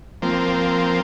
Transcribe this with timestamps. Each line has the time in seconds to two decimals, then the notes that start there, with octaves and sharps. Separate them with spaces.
0.22 F3 A#3 C4